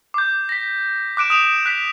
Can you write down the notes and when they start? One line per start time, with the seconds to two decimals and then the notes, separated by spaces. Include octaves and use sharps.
0.14 D6 G6
0.49 A#6 B6
1.17 D6 F#6 D7 E7
1.30 D#6 D7 E7 F7
1.66 F#6 B6